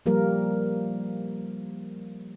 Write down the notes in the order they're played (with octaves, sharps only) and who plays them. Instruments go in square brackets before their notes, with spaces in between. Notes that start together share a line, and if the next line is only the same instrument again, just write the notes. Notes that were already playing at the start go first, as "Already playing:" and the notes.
[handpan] F3 G3 A#3 A#4